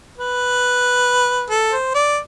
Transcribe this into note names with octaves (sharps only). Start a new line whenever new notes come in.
B4
A4
C5
D5